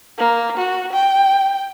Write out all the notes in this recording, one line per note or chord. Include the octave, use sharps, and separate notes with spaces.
A#3
F#4
G5